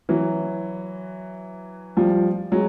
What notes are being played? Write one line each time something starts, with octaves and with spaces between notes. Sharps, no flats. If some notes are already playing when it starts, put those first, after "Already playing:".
E3 F#3
F3 G3
F#3 G#3